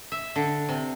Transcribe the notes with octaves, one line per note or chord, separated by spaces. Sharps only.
E5
D3
C3